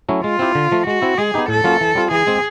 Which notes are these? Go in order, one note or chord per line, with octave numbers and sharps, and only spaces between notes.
F#3 A3 C#4 E4
G#3 F4
C4 E4 G4
D3
F3 A3
G#3 F#4
C4 E4
G#3 G#4
B3 D#4 G4
A2 A4
F#3 A#3 C#4 F4
E3
G3 C4 F4
E3 G#4
G#3 C4